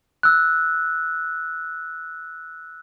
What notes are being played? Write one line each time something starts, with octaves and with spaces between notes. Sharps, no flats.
E6 F#6